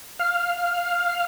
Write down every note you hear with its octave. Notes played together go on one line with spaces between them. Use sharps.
F5 F6